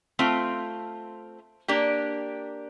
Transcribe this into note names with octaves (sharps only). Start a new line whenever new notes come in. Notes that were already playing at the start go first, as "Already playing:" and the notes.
A3 C4 F4
A#3 D4 G4